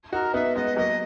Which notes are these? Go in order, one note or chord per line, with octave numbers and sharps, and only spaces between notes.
D#4 F#4 A#4
B3 D#4 E5
G#3 B3 D#5
F#3 A#3 D#5